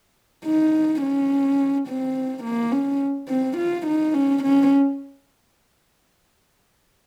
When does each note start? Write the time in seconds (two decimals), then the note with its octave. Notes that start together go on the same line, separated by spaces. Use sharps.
0.45 D#4
1.02 C#4
1.88 C4
2.44 A#3
2.72 C#4
3.29 C4
3.57 F4
3.87 D#4
4.14 C#4
4.43 C#4